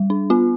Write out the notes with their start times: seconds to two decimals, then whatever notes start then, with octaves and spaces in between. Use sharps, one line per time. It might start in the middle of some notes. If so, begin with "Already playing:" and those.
Already playing: G3
0.10 D4
0.30 B3 F4